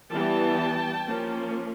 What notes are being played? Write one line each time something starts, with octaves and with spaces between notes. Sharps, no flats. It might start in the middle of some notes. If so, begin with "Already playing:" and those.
E3 G3 B3 G5 A5
F3 A#3 C#4